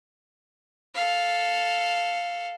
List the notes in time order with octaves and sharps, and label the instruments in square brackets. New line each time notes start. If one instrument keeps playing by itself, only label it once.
[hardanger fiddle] A4 F5